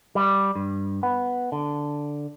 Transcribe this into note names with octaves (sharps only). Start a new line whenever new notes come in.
G3
G2
B3
D3